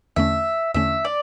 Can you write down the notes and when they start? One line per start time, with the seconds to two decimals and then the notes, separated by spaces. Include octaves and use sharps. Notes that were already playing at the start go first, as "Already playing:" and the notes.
0.16 E2 D3 A3 C#4 E5
0.74 E2 D3 A3 C#4 E5
1.05 D5